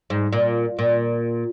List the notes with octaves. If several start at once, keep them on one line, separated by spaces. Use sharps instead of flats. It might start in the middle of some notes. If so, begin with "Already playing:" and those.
G#2
A#2
A#2